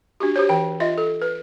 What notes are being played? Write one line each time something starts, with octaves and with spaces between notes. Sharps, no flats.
D4 F#4 G4
G4 C5 C#5
E3 G5
F4 D#5 E5
A4
B4